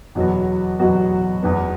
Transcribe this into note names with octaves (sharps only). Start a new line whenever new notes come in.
E2 B2 F#3 B3 F#4
E2 B2 F#3 B3 F#4
E2 E3 B3